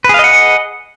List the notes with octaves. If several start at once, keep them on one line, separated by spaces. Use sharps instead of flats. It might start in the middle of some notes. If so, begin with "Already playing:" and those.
G#4 B4 D#5 F5 F#5